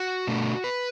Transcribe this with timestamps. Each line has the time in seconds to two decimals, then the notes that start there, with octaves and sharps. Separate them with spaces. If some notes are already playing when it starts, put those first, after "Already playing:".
Already playing: F#4
0.27 B2 A3 D4
0.64 B4